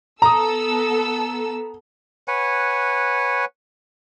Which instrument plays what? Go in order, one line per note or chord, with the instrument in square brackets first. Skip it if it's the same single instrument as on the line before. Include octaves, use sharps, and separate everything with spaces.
[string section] B3 A4 E6 [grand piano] A#5 D#6
[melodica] B4 C#5 F#5 G#5